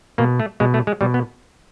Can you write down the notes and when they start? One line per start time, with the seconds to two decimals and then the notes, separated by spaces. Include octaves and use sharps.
0.18 B2 A#3
0.40 A3
0.60 B2 G#3
0.74 A3
0.87 G#3
1.01 B2 G3
1.14 B3